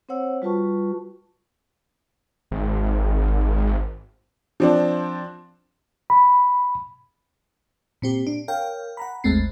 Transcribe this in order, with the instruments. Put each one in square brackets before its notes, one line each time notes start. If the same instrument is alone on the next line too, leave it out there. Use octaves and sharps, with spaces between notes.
[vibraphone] C4 C5 C#5 F#5 E6
G3 F4 F#4 B4 A5 C#6
[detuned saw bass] G#1
[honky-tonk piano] F3 C4 D4
[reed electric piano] B5
[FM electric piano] A#2 C4 G4
D4
A#4 C#5 F5 G5
F#5 A#5 B5
G#1 D#2 G#3 A3 C4 C7